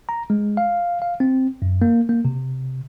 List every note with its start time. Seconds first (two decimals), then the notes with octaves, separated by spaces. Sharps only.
0.09 A#5
0.30 G#3
0.57 F5
1.02 F5
1.20 C4
1.62 F#2
1.82 A#3
2.09 A#3
2.25 C3